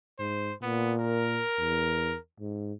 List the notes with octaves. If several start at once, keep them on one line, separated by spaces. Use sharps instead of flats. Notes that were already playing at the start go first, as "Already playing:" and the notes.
G#2 C5
A#2 B3
A#4
E2
G#2